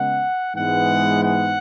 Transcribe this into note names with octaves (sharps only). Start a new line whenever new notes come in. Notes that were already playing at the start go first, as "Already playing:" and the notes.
Already playing: C#3 G#3 B3 F#5
G#2 E3 G#3 B3 F#5
F#5